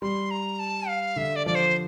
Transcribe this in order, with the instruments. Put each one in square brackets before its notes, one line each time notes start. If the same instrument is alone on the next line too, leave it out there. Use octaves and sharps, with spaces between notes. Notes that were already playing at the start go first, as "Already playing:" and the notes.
[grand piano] G3 [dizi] C6
[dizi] A#5
A5
F5
[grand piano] D3 [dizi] E5
[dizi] D5
[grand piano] F3 [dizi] D5
[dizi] C5